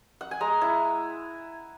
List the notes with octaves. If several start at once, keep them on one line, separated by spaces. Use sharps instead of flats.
F#5
G#5
G#3 A#5
E4